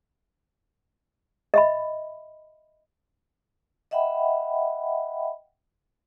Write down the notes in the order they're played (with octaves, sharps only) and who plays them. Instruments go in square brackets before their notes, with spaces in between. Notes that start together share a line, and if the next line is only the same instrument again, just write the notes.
[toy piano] D#5 E5 B5
[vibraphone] D#5 E5 F#5 G5 B5